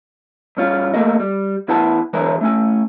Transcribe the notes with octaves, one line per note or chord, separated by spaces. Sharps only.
G2 C#4 F4
A3 A#3 A4 A#4 D#5
G3
E2 E4 B4 F#5 A5
D3 E3 G#3 A#4 B4 C#5
A3 C#4 G#5